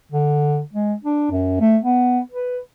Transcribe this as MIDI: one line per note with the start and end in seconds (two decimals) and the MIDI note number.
0.11 0.60 50
0.73 0.93 56
1.04 1.28 62
1.31 1.60 42
1.60 1.77 57
1.83 2.19 59
2.31 2.58 71